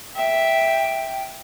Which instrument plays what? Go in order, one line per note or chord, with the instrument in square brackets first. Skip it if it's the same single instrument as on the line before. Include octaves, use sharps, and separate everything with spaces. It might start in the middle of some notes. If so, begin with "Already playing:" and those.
[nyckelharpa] E5 [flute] G5